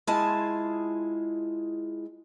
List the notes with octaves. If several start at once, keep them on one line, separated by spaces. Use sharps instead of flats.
G#3 E4 F4 G#4 A5